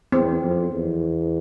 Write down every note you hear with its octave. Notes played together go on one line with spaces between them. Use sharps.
E2 C4
F2
E2